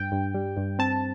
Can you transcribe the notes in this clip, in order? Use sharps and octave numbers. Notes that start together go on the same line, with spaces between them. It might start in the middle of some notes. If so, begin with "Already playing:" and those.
Already playing: G2 G5
G2
G3
G2
C4 A5